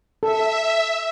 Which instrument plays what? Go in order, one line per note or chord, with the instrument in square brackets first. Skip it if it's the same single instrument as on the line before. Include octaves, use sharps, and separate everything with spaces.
[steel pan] A4 [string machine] E5